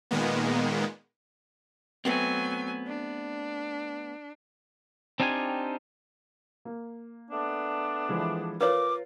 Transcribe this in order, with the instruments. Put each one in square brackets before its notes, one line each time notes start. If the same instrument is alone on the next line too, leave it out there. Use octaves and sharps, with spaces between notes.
[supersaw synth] A#2 D#3 G#3 A#3 B3
[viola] F#3 G#5 [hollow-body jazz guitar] A3 B3 C4
[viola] D4
[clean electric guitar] C4 D4 D#4 F4 G4 G#5
[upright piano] A#3
[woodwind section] A3 B3 D4
[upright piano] E3 F3 G#3
[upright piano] F4 A#4 [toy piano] B4 C#5 [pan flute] D6